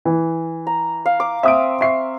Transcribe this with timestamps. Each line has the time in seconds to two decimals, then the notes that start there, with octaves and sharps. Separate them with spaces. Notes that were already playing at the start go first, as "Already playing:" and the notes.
0.05 E3
0.67 A#5
1.06 F5
1.20 D6
1.43 C4 E5 D#6 D7
1.81 E5 C#6 C7